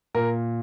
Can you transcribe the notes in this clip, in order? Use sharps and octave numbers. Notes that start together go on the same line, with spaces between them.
A#2 A#4